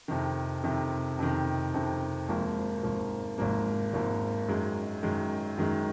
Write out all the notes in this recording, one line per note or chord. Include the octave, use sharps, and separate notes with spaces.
F2 C3 D#3
F2 C3 D#3
F2 C3 D#3
F2 C3 D#3
G#1 G#2 F3 A#3
G#1 G#2 F3 A#3
G#1 G#2 F3 A#3
G#1 G#2 F3 A#3
F#2 D#3 G#3
F#2 D#3 G#3
F#2 D#3 G#3